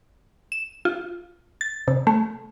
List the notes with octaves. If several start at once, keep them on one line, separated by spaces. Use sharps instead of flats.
E7
F4
A6
C3
A3